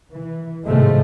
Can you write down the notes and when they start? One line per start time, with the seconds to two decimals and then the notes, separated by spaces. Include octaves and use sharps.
0.10 E3
0.65 G#1 A2 C3 F3 G#3 A3